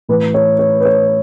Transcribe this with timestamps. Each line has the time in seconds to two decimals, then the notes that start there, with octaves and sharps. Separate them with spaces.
0.09 A2 E3 B4
0.34 C#5
0.59 C#5
0.80 B4
0.85 C#5